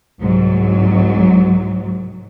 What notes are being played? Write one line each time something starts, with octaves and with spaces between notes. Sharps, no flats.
C2 G#2 F#3